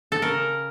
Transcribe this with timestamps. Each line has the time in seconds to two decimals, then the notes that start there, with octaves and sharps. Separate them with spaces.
0.12 A4
0.22 C#3 A#4